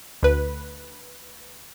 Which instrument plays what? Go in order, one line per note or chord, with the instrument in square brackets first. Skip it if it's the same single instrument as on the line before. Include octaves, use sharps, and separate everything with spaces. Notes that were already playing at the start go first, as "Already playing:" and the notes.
[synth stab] D2 B4